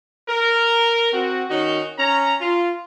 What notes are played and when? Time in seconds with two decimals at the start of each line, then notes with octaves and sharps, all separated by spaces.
0.30 A#4
1.13 C4 F#4
1.50 D#3 C#4 D#4 F#4
1.99 C#4 A#5
2.41 F4